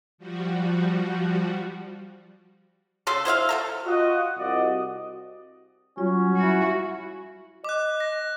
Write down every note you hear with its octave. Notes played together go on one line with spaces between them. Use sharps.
F3 G3 F#4
C#3 A4 C6
E4 C5 E5 F5
A3 A4 A#5
F4 F#4 D#5
C2 F#4 D5 D#5
F#3 G3 C#4 F4
E4 F#4
D#5 D6 F#6
A#6